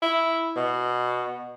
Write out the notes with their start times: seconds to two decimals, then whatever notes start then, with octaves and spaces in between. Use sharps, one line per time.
0.02 E4
0.56 B2